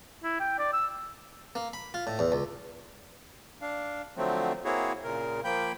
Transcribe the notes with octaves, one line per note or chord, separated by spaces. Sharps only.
E4
G5
D5
E6
A#3
B5
F4
A2
E2
C#2
D4 F5
D3 F3 F#3 A3 C4
A#3 C4 E4 F#4 G#4 C#5
A#2 C#3 A#4
F3 A#3 G5 B5 G6